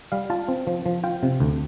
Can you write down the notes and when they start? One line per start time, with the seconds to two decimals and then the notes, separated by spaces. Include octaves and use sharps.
0.12 G3 F5
0.30 F4 A5
0.48 C4
0.67 F3
0.86 F3
1.04 F4 G5
1.23 C3
1.40 D2